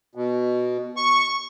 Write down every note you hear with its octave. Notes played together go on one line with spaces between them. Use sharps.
B2
C#6